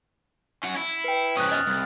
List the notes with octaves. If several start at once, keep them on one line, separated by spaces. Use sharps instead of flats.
C#4 F#5
E4
B4 G5
G#2 C#4 D#6 F#6
D#5 F6 A6
C2